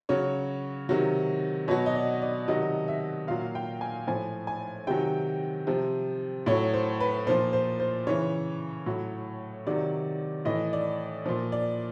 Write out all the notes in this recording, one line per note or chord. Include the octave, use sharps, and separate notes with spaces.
C#3 F#3 C#5
C3 D#3 F#3
B2 F#3 C#5
D#5
D5
D5
C3 D#3 F#3 D#5
E5
A#2 F#3 F5
G5
G#5
A2 F3 G#5
G#5
C3 D#3 F#3 G5
C3 F3
A2 F#3 C#5
C5
B4
A#2 F3 C5
C5
C5
C#3 E3 C#5
A2 F#3
C3 D#3 F#3 D5
A2 E3 D#5
D5
A#2 F3
D5